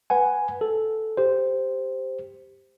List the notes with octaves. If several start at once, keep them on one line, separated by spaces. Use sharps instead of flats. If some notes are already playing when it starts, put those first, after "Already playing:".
B4 F#5 G#5
A4
G4 C5